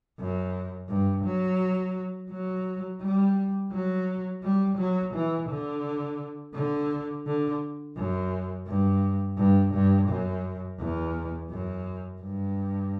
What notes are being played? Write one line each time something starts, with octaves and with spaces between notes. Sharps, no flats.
F#2
G2
F#3
F#3
G3
F#3
G3
F#3
E3
D3
D3
D3
F#2
G2
G2
G2
F#2
E2
F#2
G2